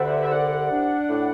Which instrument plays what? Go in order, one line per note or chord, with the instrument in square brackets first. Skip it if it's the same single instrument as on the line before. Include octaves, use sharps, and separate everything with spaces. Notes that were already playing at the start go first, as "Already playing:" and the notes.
Already playing: [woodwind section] D2 D3 [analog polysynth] G4 B4 C5 D5 E5 F#5
[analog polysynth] E5
[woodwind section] C2 [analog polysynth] D5 F#5
[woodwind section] D4
A2